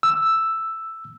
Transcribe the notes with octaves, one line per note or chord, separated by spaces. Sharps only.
E6